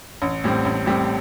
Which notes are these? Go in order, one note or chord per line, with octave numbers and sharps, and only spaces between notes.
A1
A2 G3 C4
A1
A2 G3 C4